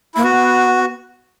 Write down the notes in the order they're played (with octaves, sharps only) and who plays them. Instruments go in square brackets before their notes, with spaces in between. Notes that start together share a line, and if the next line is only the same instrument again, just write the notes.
[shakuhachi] A#3 [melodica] E4
[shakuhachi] B3 [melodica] F#4